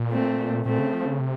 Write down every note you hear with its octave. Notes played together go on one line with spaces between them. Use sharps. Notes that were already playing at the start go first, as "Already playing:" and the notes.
Already playing: A#2
A3 C4
A#2 A3 C4
C#3
F3
C#3
C3